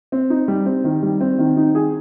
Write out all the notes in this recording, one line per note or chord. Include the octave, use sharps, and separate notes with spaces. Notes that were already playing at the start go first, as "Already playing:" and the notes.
C4
D#4
G3
C4
D#3
G3
C4
D#3
D#4
G#4